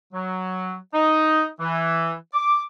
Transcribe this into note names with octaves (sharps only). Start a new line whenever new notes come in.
F#3
D#4
E3
D6